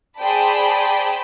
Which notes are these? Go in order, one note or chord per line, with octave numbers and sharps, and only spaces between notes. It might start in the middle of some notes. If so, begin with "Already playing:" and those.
G#4 C5 D5 G5 A5 B5